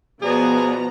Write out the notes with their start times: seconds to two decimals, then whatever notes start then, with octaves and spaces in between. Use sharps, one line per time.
0.22 B2 F3 B3 G#4 D5 A#5